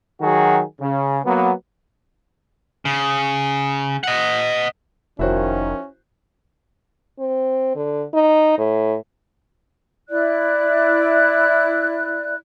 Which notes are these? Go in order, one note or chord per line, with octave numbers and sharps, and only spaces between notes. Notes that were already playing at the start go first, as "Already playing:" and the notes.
D#3 F#3 F#4 G#4
C#3
F#3 A#3 B3
C#3
D#5 F#5
F1 D#3 F3 C#4 E4 F#4 C5
C4
D3
D#4
A2
E4 D5 F#6